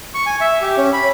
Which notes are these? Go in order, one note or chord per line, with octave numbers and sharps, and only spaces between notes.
C#6
G#5
E5
G4
C#4
B5